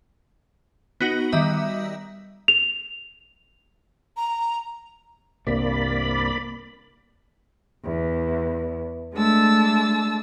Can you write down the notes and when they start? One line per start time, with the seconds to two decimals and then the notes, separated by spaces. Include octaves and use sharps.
1.01 B3 D#4 F#4
1.32 D#3 G3 D#5 E5
2.48 F7
4.17 A#5
5.47 C2 G2 C3 A#3 D5 B5
7.84 E2
9.13 G#3 A3 D4 A5 E6